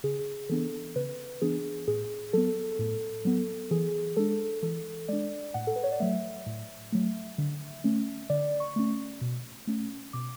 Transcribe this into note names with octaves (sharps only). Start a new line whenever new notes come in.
C#3 G#4
E3 B3 D4 A4
C#3 B4
E3 B3 D4 G#4
A2 G#4
F#3 B3 A4
A2
F#3 B3
E3 G#4
G#3 D4 A4
E3 A4
G#3 D4 D5
A2 F#5
A4
B4
C#5
D5
F#3 A3 E5
A2
F#3 A3
D3
A3 C#4
D3 D5
C#6
A3 C#4
B2
A3 C#4
B2 D6